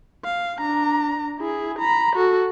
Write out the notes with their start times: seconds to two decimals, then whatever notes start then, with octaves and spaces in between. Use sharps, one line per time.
0.25 F5
0.61 D4 A#5
1.38 E4 G#4
1.79 A#5 B5
2.16 F#4 A4